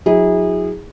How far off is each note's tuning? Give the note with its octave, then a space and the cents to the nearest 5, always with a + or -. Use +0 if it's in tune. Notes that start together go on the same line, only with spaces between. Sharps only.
F#3 -35 E4 -40 G#4 -25